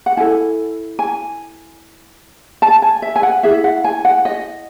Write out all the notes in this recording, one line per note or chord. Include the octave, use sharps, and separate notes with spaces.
F#5
E4 A4 G#5
G#5
A5
G#5
E5
G#5
F#5
E4 G#4 E5
F#5
G#5
F#5
D#5